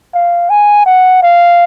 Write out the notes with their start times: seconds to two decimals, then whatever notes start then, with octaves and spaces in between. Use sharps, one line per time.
0.14 F5
0.50 G#5
0.86 F#5
1.23 F5